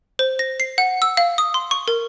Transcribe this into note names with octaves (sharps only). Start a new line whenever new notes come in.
C5
A#6
C7
F#5
E6
F5
D#6
C6
C#6
A#4